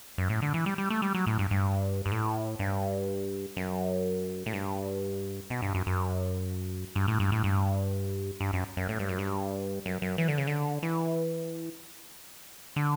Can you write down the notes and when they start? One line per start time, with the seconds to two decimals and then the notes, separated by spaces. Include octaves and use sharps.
0.18 F#2
0.29 A2
0.42 D3
0.54 E3
0.66 G3
0.78 G3
0.90 A3
1.02 G3
1.15 F#3
1.27 A2
1.39 G2
1.51 G2
2.06 G2
2.12 A2
2.59 G2
3.56 F#2
4.46 A2
4.53 G2
5.50 B2
5.62 G2
5.74 F#2
5.87 F#2
6.95 G2
7.08 A2
7.20 G2
7.32 A2
7.44 G2
8.40 G2
8.53 F#2
8.77 F#2
8.89 A2
8.99 G2
9.09 F#2
9.18 G2
9.86 F#2
10.02 F#2
10.18 E3
10.28 D3
10.38 C#3
10.47 D3
10.83 E3
12.76 D3